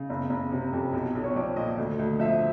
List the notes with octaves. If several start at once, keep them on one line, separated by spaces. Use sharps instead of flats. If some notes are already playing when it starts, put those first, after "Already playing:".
Already playing: C#3
F#1
F#1
C3
F2
B1
B1
C#5
F3 D5
A#2 D#5
D2
D2
F3 E5